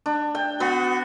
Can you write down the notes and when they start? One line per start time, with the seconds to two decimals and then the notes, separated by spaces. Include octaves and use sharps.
0.06 D4
0.35 G5
0.60 B3 F#4